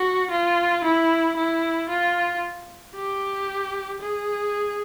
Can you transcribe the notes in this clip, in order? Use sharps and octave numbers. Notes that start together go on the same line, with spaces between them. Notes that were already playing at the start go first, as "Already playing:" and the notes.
Already playing: F#4
F4
E4
E4
F4
G4
G#4